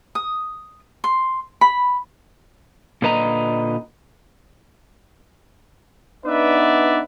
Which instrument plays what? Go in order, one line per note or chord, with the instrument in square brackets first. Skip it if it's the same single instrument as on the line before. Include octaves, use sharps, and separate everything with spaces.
[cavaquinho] D#6
C6
B5
[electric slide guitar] A#2 D3 B4 D#5 A#5
[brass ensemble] B3 D4 D#4 B4 D5 E5